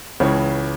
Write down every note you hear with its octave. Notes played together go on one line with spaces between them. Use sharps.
C#2 C#3 E3 C#5